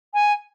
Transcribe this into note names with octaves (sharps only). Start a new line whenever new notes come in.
G#5